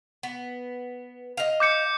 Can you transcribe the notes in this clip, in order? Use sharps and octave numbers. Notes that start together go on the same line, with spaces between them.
B3
D#5 F5
D6 G6 C#7